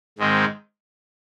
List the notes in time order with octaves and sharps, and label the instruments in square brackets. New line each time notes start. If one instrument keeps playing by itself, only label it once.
[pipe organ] G#2 D#3 G#3 C4